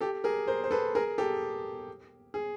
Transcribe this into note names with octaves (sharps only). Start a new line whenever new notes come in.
G4 A4
G#4 A#4
A#4 C5
C5
A4 B4
G#4 A#4
G4 A4
G#4